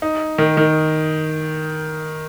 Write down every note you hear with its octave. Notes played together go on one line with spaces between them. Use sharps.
D#4
D#3
D#3